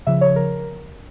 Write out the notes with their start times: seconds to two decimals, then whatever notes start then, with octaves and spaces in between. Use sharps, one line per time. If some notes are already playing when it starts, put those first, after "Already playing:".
0.07 C#3 F3 E5
0.21 C#5
0.36 A#4